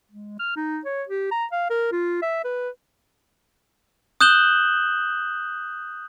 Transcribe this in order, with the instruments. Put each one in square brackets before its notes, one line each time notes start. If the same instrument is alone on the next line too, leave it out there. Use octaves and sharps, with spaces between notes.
[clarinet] G#3
F6
D#4
C#5
G4
A#5
F5
A#4
F4
E5
B4
[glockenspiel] D#6 F#6 G6 E7 F#7 G7